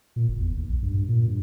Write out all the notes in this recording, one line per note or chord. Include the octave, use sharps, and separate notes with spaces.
A#2
F#1
E2
D#2
B1
G2
G2
A#2
G2